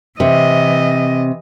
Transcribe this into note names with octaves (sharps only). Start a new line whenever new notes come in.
C3 E3 D#5